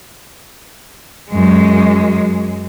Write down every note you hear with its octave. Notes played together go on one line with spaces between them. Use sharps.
F#2 G#3